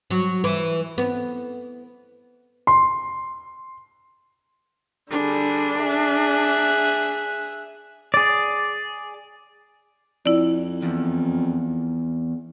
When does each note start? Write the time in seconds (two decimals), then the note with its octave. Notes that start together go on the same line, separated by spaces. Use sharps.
0.11 F#3
0.44 E3
0.98 B3
2.67 C6
5.11 D3 G3 D4 G#4
5.79 G#4 E5 F#6
8.14 G#4 D5
10.26 F2 E4 D5
10.82 E2